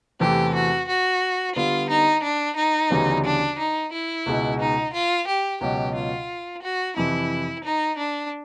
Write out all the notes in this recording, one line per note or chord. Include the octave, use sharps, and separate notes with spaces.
E2 C3 E3 A3 C4 G4
F#4
F#4
D3 G3 B3 F4
D#4
D4
D#4
D2 C#3 E3 G3 B3
D4
D#4
E4
C#2 B2 G#3
D#4
F4
G4
C#2 B2 F#3 G4
F4
F#4
F2 C3 E3 E4
D#4
D4